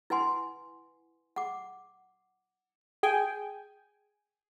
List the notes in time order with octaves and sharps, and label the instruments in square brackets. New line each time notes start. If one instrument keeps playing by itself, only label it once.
[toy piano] E4 B4 F#5 G#5 C6
F#5 D6
[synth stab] G#4 G5 G#5